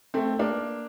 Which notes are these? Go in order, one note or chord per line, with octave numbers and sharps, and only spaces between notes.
A3 C4
A#3 D4